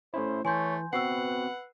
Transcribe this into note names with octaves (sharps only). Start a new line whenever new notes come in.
A3 C#4 E4 C5
E3 A3 C#5 G#5 C6 G6
B3 C4 F#4 B4 F#5 E6 C7